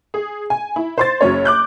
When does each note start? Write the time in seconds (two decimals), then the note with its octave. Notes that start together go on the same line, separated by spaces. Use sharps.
0.14 G#4
0.50 G#5
0.76 E4
0.98 C5 C6 A6
1.21 F#1 F#3 C#4 C#5
1.45 D6 F#6 G6